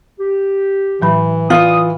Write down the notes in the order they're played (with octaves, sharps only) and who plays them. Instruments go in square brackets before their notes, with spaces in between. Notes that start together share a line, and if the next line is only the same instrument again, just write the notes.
[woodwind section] G4
[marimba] A2 F#3 B5 [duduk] E3
[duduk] E3 [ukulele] F4 [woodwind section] D5 D#6